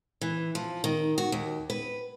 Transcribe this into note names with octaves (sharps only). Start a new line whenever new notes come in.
E3
F3
D#3
F#4
D#2
B4